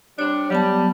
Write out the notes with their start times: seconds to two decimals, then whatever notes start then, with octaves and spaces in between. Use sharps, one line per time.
0.19 C3 G3 D4 C#5
0.50 F#3 G3 B3 A5